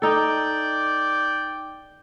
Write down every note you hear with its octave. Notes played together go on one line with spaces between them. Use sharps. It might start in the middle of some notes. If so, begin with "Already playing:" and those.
D#4 A4 D5 G5